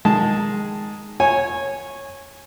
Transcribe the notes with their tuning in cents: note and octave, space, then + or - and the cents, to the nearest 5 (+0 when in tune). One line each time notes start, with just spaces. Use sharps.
D#3 +0 G#3 +0 A5 +0
C#5 -15 G#5 +0